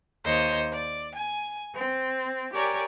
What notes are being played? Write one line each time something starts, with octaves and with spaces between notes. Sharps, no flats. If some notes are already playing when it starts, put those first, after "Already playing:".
D#2 C5 C#5 D#5
D5
G#5
C4
G4 A#4 C#5 D5 G#5